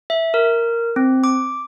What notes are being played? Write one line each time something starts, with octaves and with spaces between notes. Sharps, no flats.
E5
A#4
C4
D6